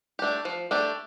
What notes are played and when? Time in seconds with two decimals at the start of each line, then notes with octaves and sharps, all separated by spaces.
0.19 A3 D4 G4
0.45 F3
0.71 A3 D4 G4